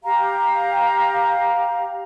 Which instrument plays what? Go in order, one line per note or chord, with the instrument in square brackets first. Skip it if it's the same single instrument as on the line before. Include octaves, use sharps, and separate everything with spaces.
[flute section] G4 F5 A#5